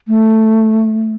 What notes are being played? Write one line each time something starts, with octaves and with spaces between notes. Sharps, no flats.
A3